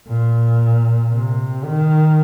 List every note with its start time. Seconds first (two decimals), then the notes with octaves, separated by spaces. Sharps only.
0.08 A#2
1.12 C3
1.65 D#3